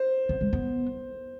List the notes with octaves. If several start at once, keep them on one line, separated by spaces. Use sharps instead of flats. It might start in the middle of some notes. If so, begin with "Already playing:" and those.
Already playing: C5
B3
G#3
B3